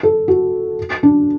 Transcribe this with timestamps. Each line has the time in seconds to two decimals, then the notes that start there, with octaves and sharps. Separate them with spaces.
0.03 A4
0.28 F#4
1.03 D4